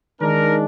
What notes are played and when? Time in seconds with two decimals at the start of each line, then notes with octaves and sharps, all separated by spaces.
0.20 D#3 G#3 D4 A#4